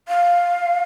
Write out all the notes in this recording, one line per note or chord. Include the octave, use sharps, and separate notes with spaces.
F5